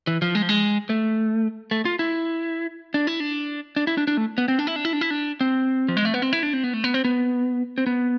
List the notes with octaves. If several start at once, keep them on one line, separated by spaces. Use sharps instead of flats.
E3
F3
G#3
F3
G#3
A3
A3
F4
E4
D4
E4
D4
D4
E4
D4
D4
A3
B3
C4
D4
E4
D4
E4
D4
E4
D4
C4
F3
G#3
A3
B3
C4
E4
D4
C4
B3
A3
B3
C4
B3
C4
B3